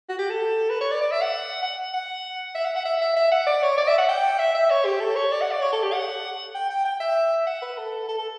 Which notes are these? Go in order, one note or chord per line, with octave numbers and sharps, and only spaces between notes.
F#4
G4
A4
B4
C#5
D5
D5
E5
F#5
F#5
F#5
E5
F#5
F#5
E5
E5
E5
F#5
D5
C#5
D5
E5
F#5
G5
E5
E5
C#5
G4
A4
C#5
D5
F#5
D5
C#5
A4
G4
F#5
G5
G5
G5
E5
F#5
B4
A4
A4
A4